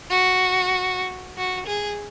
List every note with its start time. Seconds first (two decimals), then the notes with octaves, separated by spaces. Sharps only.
0.10 F#4
1.38 F#4
1.66 G#4